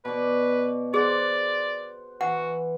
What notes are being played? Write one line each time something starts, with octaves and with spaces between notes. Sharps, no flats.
B2 B4 D5
G#4 C5 D5 F#5
E3 F#4 F#5